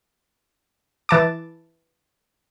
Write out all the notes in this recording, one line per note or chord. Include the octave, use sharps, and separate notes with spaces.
E3 A5 D6